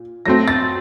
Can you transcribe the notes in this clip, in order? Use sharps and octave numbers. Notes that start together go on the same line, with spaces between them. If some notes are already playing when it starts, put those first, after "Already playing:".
Already playing: A#2
F#3 A3 C4 A#6
A6